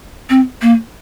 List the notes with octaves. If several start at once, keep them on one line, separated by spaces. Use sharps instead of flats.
C4
A#3